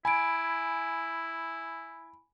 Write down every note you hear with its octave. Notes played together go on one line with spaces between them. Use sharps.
E4 G#5 B5 D7